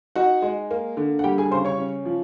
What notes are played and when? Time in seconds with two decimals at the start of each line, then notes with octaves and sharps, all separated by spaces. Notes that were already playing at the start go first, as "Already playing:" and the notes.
0.16 D#4 F#4 F#5
0.42 G#3
0.71 A#3
0.97 D3
1.19 F#5
1.24 G3 G4 G5
1.38 G#4 G#5
1.51 C#3 C5 C6
1.65 C#5 C#6
1.79 C#4
2.05 F3